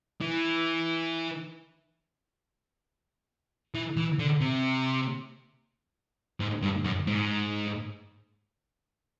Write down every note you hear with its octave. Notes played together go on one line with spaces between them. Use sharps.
E3
E3
E3
D3
C3
G#2
G2
F#2
G#2